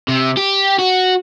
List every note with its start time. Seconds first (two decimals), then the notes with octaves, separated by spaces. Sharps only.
0.08 C3
0.37 G4
0.79 F#4